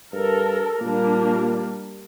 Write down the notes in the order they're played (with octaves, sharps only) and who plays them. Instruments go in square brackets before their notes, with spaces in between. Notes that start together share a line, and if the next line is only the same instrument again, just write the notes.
[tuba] G2 [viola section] A4 A#4
[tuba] A#2 [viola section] G3 A#3 D4